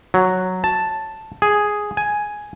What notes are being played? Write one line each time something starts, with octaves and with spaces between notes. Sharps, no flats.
F#3
A5
G#4
G#5